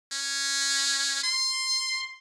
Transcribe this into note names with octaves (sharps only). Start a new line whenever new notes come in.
C#4
C6